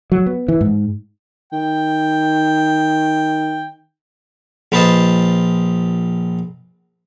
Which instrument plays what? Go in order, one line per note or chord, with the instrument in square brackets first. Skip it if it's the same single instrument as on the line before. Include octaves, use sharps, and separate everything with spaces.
[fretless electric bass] F#3
B3
E3
G#2
[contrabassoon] D#3 [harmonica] G5
[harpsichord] A#1 F4 B4 C5 D#5 A5